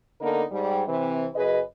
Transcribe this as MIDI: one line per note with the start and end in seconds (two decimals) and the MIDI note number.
0.21 0.43 50
0.21 0.43 58
0.21 0.43 59
0.21 0.43 63
0.21 0.43 69
0.21 0.43 70
0.52 0.83 44
0.52 0.83 55
0.87 1.26 48
0.87 1.26 52
0.87 1.26 60
1.35 1.60 42
1.35 1.60 49
1.35 1.60 68
1.35 1.60 71
1.35 1.60 75